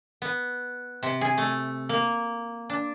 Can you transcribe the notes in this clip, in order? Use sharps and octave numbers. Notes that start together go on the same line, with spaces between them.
B3
C3
G#4
A3
A#3
D4